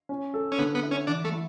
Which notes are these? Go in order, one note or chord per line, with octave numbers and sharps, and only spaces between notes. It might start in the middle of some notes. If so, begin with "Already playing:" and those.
C#4
A4
C#4
D3 B3
B3
E4
C#4
E3 D4
A3
E4